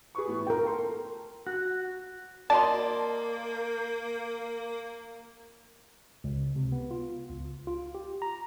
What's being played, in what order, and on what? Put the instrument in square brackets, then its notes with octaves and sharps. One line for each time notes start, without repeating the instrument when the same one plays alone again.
[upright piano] G#4 B4 C#6
A2 E3 B3
[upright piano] F4 [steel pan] A#4 G5
[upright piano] A4 C6
[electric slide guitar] F#4
[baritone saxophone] A#3 [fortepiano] D5 D#5 C6 [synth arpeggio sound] A5
[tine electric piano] C#2
C3
B3
F4
C#2
F4
G4
A#5